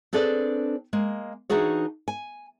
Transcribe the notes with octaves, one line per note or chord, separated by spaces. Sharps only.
C4 D4 G#4 A4 B4 D5
G#3 A#3
E3 D4 D#4 F#4 G#4 C#5
G#5